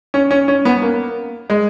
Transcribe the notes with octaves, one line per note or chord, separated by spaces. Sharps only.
C#4
C#4
C#4
B3
A#3
G#3